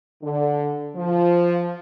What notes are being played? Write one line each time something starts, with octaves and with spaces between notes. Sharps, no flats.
D3
F3